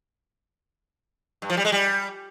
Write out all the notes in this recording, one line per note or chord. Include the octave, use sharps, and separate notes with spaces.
G2
F3
G3
G#3
G3